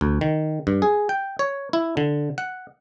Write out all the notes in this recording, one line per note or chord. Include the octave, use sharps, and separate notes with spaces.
D2
D#3
G2
G#4
G5
C#5
E4
D3
F#5